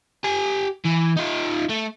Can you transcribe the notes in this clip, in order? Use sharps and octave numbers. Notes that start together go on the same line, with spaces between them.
G4 G#5
E3
D#4 F4
A3